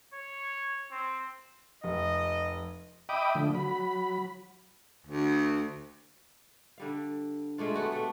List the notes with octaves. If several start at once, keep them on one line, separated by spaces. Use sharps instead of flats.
C#5
C4
F1 D#5
D#5 E5 G5 B5 D6 D#6
D3 F3 A3
F#3 B5
D2
D3 G3 F5
G#3 A3 D4 F4
A3 B3 F#4 G4
A3 D4